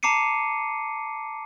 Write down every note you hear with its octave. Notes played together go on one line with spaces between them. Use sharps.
A5 A#5 D6 C7 C#7 D#7